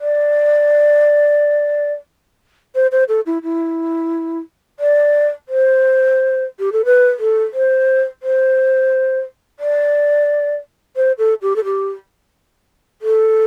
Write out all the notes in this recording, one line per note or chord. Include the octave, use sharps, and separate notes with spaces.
D5
C5
C5
A4
E4
E4
D5
C5
G4
A4
B4
A4
C5
C5
D5
C5
A4
G4
A4
G4
A4